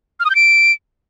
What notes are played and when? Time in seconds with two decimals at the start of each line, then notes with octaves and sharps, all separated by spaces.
0.20 F6
0.25 D#6
0.30 G6
0.35 D7